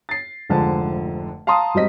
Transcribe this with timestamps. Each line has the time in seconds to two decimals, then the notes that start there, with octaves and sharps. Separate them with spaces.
0.09 A6 C7
0.50 F1 G#2 D3 F3 G#3 A5
1.47 F5 A5 A#5 C6 D#6
1.74 G#2 F#3 G3 C4 D#5 B6